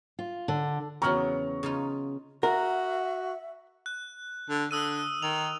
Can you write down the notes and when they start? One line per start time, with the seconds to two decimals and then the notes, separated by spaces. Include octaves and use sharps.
0.19 F4
0.48 D3
1.02 E2 C#3 F#3 B3 C4 A#5 C#6 F6
1.63 C#3 D#4 F4
2.43 F#4 A#4 E5 F#5
3.86 F#6
4.50 D3
4.71 D3 D#6 E6 D#7
5.22 D#3 F7